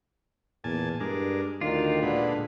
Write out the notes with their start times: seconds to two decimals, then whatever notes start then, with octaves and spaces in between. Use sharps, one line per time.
0.64 E2 A#2 G#5 A5
1.00 G2 G#3 D4 A#4
1.61 D2 D#3 D4 F4
2.02 A#2 D3 G#3 B4